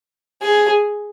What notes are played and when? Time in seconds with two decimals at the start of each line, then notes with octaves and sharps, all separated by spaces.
0.42 G#4